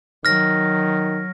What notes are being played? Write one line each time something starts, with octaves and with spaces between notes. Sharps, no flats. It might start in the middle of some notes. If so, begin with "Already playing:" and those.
D#3 F#3 F6 A#6